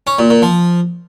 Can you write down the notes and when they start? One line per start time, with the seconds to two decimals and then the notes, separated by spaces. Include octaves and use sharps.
0.07 C#4
0.19 A#2
0.30 A#2
0.42 F3